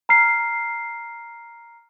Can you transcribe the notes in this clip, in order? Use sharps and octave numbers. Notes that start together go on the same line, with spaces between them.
A#5 F6 C7